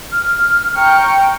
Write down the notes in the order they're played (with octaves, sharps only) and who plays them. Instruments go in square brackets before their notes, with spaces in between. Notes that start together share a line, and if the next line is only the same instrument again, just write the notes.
[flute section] F6
[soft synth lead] G5 [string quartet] A#5 C#6